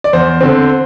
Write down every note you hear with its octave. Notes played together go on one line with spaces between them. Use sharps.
D5
E2 C5
D3 C4